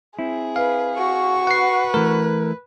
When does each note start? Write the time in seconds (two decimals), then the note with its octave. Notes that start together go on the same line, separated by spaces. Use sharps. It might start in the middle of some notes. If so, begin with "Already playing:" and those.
0.19 C4 E4 G#4
0.56 B4 F5
0.96 F#4 C#6
1.47 B4 F#5 C7
1.94 E3 A3 A#4